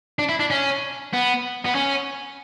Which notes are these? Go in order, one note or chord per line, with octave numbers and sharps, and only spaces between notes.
D4
E4
D4
C#4
B3
B3
C#4